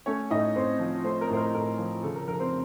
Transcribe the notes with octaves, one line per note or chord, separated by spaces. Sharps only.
A3 C#4 C#5
A2 D#4 D#5
A2 C4 C5
F3
A3 C4 C5
A#4
A2 C5
A#4
A2 A#4
F3
C#3 A4
A#4
F1 A#4
C4 C5